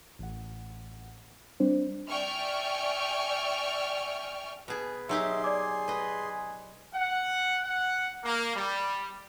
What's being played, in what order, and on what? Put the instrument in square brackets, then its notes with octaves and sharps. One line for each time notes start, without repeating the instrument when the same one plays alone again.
[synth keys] A1 F#5
G3 C4 D4 C5
[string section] D5 E5 G5 G#5 C#6 F6
[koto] B2 G#4 [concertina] B4
[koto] F#3 D#4 G4 [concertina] G#4 C6 [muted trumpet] E5
[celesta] D5 D6 [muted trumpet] G#5
[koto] B4 D#5
[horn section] F#5
F#5
A#3
G3